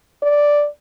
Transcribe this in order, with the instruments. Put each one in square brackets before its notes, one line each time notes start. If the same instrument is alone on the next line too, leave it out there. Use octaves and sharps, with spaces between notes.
[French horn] D5